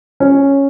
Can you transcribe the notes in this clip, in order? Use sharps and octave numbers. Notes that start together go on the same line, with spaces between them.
C#4